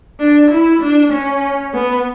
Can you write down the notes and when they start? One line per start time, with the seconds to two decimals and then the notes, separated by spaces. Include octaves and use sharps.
0.20 D4
0.51 E4
0.82 D4
1.12 C#4
1.74 B3